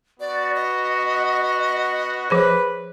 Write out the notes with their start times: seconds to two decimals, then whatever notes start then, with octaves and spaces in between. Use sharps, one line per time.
0.20 B3 F#4 D5
0.56 D#5
2.30 F3 G#4 B4 C5